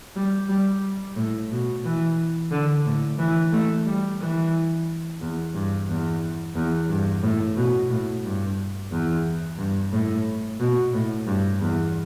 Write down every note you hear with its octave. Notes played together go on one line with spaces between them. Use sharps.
G3
G3
A2
B2
E3
D3
A2
E3
A3
G3
E3
E2
G2
E2
E2
G2
A2
B2
A2
G2
E2
G2
A2
B2
A2
G2
E2